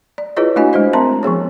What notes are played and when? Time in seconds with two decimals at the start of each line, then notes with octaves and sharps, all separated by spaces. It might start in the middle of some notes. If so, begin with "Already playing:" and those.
0.18 D5
0.37 E4 F4 G#4 B4 C#5 D#5
0.56 A3 D4 E4 F#4 D#5 G#5
0.73 G#3 D4 C5 D#5
0.93 C4 A#4 E5 A5 A#5 C6
1.23 F3 B3 G#4 C#5